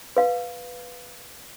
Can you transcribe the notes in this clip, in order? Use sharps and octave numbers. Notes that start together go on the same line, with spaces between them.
B4 F5